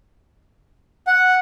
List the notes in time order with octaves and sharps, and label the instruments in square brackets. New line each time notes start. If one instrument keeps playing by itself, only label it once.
[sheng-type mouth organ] F#5